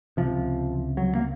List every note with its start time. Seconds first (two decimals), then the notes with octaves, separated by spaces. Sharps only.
0.17 C#2 C3 F3
0.97 F#3
1.15 A#3